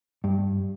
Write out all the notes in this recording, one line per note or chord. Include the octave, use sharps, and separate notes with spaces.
G2